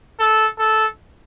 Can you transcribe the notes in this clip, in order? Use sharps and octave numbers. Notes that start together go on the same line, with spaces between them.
A4
A4